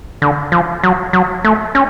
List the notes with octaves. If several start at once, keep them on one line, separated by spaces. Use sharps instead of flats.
D3
F3
F#3
F#3
A3
C#4